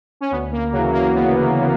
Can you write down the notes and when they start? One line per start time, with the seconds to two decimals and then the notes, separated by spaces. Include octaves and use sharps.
0.21 C#4
0.31 D2 B3
0.52 A#3
0.72 C#3 F#3
0.77 E3
0.93 A#3
1.13 D2 B3
1.55 C#3 E3